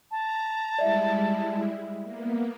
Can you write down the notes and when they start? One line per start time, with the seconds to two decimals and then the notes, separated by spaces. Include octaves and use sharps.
0.11 A5 A#5
0.79 G3 G#3 E4 D5 E5
2.03 A#3 B3